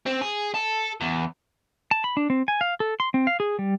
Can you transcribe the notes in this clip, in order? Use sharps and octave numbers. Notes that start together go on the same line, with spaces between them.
C4
G#4
A4
E2
A5
B5
D4
C4
G#5
F5
A4
C6
C4
F5
G#4
G3